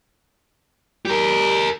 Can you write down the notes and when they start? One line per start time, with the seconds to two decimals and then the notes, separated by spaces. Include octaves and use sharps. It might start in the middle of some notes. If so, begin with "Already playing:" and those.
1.05 G3 G4 A#4